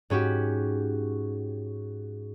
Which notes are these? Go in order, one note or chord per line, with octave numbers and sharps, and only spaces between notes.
G#2 C#4 F#4 G4